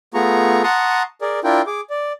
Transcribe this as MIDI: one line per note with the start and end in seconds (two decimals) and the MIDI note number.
0.14 0.63 57
0.14 0.63 59
0.14 0.63 65
0.14 0.63 68
0.14 0.63 82
0.14 0.63 85
0.64 1.03 78
0.64 1.03 81
0.64 1.03 82
0.64 1.03 84
0.64 1.03 85
0.64 1.03 87
1.21 1.40 68
1.21 1.40 70
1.21 1.40 74
1.44 1.62 62
1.44 1.62 64
1.44 1.62 65
1.44 1.62 70
1.44 1.62 79
1.67 1.81 68
1.67 1.81 86
1.90 2.12 74